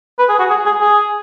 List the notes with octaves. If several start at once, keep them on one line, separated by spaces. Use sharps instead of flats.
B4
G#4
F#4
G#4
G#4
G#4